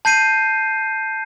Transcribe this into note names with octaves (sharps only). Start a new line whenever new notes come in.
A5 G6 C7 D#7